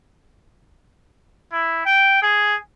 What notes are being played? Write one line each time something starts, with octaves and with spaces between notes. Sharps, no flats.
E4
G5
G#4